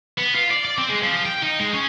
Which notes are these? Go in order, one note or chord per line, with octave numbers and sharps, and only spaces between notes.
B3
F4
D5
D5
C4
G#3
F3
G5
D#4
G#3
C#4